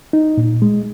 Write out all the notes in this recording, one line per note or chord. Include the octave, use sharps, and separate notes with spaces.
D#4
A#2
G#3